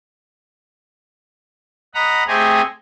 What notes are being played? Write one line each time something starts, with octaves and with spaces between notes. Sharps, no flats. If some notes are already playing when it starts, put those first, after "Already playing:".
D#5 F#5 A#5 B5
A3 C4 G4 G#4 D#5 G#5